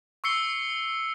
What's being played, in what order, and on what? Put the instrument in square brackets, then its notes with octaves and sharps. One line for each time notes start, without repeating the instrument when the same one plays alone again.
[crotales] C#6 E6 C7 C#7 G7